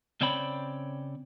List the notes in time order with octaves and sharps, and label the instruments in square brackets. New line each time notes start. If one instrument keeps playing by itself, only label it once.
[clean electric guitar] C#3 C4 C#5 D5 G5 B5